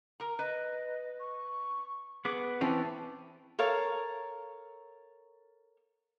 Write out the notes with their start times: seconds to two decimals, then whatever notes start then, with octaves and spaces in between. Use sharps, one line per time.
0.20 A#4 A#5
0.39 B4 D#5
1.20 C#6
2.25 B3 G#4 B4 D6
2.61 E3 C4 C#4 A5
3.59 A4 A#4 C#5 F5